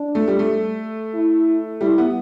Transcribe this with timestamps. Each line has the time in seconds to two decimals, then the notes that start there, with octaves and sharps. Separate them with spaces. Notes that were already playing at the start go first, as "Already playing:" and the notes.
Already playing: D4
0.15 A3
0.28 G3
0.39 A3
1.14 E4
1.81 G3 E4
1.98 B3